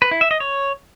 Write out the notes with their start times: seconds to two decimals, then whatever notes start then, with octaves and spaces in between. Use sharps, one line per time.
0.02 B4
0.11 E4
0.21 E5
0.31 D#5
0.40 C#5